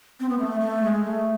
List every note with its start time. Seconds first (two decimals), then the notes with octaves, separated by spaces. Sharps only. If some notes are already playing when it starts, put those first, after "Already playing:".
0.20 C4
0.29 B3
0.39 A3
0.60 A3
0.82 G#3
1.05 A3